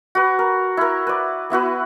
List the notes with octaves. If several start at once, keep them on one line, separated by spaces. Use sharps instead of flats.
F#4 B4
A#4
E4 A#4
B4 D5
B3 E4 F#4 B4